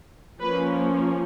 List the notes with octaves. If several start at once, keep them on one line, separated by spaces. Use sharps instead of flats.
F3 A#3 C#4 B4